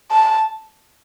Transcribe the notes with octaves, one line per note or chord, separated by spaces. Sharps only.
A5